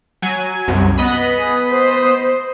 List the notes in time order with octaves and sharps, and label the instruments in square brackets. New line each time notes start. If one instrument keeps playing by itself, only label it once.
[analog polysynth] F#3 G#5
C2 F#2
B3 D#5 B5
[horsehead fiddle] G#4
C5